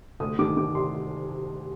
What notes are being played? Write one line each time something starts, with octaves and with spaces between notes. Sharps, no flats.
D2 D#6
D#3 D6
D#3 D6
C3 C6